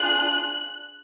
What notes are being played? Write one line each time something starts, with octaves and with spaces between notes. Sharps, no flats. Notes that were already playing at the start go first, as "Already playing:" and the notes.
Already playing: D4 F4 G#4 F#6